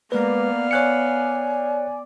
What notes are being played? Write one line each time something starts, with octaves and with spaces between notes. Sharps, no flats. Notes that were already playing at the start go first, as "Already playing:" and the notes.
G#3 A#3 B3 B4 D5 F5
C#5 G#5 F#6 C#7